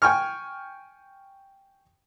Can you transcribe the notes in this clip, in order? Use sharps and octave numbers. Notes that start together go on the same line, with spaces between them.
G5 G#5 C#6 F6